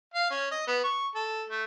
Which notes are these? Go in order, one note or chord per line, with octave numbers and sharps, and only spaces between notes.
F5
C#4
D#5
B3
C#6
A4
A3